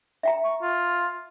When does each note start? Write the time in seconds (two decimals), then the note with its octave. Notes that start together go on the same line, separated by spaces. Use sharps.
0.23 E5 G5 A#5
0.44 C#6
0.61 F4